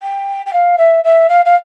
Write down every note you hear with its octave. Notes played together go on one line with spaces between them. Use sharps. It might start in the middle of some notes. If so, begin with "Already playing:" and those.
G5
G5
F5
E5
E5
F5
F5